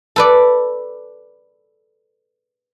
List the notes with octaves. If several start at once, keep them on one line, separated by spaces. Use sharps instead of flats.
A4 B4 D5